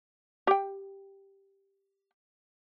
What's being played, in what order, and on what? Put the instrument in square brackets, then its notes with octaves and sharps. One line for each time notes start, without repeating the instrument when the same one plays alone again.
[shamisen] G4 G5